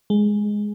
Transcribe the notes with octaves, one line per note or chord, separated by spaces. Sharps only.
G#3